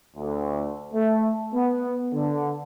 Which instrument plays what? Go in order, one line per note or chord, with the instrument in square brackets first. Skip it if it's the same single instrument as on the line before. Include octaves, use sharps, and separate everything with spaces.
[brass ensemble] D2
A3
B3
D3